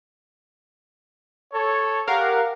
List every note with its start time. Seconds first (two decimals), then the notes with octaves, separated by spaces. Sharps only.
1.53 A4 C#5
2.08 G4 A#4 F5 F#5